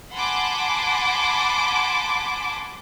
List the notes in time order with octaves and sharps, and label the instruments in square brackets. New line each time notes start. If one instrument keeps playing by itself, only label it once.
[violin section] F#5 G#5 A5 B5 C6 D6